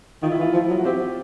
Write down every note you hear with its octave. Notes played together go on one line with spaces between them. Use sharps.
D#3 F4
E4
E3
F4
F3
F#3
F#4
C4 G4